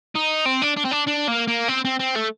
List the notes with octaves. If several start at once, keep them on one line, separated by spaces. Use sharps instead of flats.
D#4
C4
D4
D4
C4
D4
D4
A#3
A#3
C4
C4
C4
A3